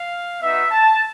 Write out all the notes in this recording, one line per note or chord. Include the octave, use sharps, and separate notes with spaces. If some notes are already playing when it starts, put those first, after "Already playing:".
Already playing: F5
B3 D#4 F#4 E5
A5